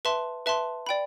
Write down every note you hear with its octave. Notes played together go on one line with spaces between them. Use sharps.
B4 E5 A5 C6
B4 E5 A5 C6
D5 G5 B5